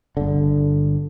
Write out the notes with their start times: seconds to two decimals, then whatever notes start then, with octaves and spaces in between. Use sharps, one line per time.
0.17 G1 D3